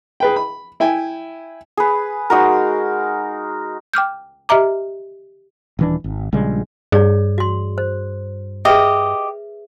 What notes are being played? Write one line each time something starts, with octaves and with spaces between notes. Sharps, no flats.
G#4 B4 G5
B5
E4 G5 G#5
G#4 B4
G#3 D#4 F#4 A#4
G5 D6 F6 G6
G4 D#5 E5 A#5 D6
D#1 E3 D4
G#1
A#1 C#3 G3 G#3
G2 G#4 C#5 D5
F#4 C6
C5
G4 G#4 B4 D#5 E5